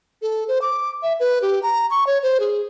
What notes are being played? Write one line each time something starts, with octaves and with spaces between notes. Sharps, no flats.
A4
C5
D6
E5
B4
G4
A#5
C#6
C#5
C5
G#4